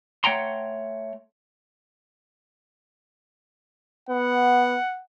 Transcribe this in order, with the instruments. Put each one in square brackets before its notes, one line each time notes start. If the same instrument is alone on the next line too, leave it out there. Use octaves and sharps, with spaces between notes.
[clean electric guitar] A3 C#5 F#5 G5 A#5 C6
[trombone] B3 [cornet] F#5